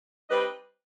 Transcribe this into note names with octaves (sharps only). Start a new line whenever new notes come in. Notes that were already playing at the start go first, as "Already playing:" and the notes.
G3 C4 D#4 B4 D#5